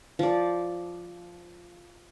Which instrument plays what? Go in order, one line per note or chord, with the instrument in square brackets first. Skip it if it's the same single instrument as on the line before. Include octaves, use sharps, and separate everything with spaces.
[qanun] F3 D5